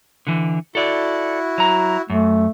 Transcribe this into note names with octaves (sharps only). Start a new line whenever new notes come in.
D3 E3
E4 F#4 A4 D5
F#3 A#5
F#2 A3